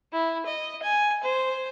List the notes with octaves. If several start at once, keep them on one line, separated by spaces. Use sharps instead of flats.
E4
D#5
G#5
C5